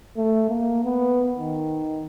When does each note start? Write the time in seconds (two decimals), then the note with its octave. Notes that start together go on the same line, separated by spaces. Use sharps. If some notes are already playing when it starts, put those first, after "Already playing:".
0.17 A3
0.49 A#3
0.84 B3
1.38 D#3